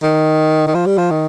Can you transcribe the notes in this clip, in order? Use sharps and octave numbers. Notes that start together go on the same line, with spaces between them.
D#3
D#3
F3
G3
F3
D#3